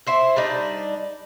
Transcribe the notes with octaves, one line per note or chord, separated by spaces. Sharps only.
E4 C5 E5
G3 D4 D#4